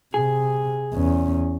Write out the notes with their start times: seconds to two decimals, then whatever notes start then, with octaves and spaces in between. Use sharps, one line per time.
0.14 C3 G#4
0.94 E2 C#4